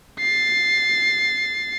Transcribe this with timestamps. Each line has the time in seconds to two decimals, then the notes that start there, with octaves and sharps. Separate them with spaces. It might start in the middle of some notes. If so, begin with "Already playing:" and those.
0.20 A6 C7